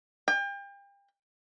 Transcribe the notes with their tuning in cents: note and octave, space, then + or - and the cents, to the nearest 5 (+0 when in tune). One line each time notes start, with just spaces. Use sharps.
G5 +35